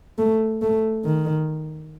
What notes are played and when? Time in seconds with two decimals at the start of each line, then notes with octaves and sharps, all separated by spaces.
0.18 A3
0.62 A3
1.05 D#3